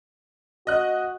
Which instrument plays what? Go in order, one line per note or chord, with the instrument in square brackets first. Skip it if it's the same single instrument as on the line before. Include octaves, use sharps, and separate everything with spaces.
[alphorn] F#4 [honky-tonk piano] D#5 F#6